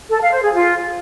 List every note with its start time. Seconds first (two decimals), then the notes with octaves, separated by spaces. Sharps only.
0.10 A4
0.21 F5
0.32 C5
0.42 G#4
0.53 F4